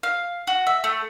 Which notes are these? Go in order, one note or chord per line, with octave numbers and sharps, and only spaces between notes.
F5
F#4
E5
A3